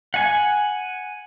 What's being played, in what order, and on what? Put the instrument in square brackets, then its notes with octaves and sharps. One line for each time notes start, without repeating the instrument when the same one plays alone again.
[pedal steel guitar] F#5 G#5